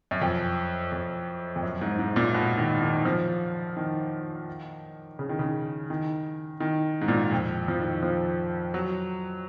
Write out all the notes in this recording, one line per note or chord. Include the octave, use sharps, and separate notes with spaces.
F#2
F2
F2
F2
F#2
G#2
G#2
A#2
B2
D#3
D#3
F3
D#3
C#3
D#3
C#3
D#3
D#3
G#2
A#2
F2
F3
D#3
F3
F#3